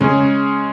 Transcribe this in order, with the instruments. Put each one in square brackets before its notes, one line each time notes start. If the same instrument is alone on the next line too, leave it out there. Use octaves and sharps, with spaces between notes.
[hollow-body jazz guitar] C#3 [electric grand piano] G#3 C#4 G#4